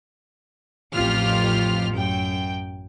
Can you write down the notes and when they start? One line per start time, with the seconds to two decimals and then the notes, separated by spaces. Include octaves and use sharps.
0.93 A1 F2 F4 G4 F6
1.92 F#2 G5